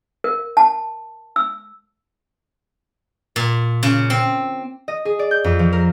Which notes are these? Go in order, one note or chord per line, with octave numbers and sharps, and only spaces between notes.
A#4
A5
E6
A#2
C#3
C4
D#5
G#4
D5
G6
F2
F3
A#4